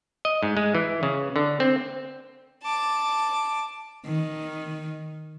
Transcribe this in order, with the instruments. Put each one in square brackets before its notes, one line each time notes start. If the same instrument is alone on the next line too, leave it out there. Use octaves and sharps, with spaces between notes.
[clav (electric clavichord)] D#5
G#2
G#3
E3
C#3
D3
C4
[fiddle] A5 D6
[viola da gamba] D#3